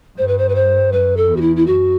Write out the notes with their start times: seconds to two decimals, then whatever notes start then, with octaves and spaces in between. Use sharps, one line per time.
0.18 G2 C5
0.27 B4
0.38 C5
0.49 B4
0.55 C5
0.92 F#2 B4
1.17 A4
1.29 E2
1.36 F#4
1.41 E4
1.56 E4
1.66 F#2 F#4